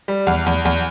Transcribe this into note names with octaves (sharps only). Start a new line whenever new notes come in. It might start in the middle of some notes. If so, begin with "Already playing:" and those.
G3
E2
E2
E2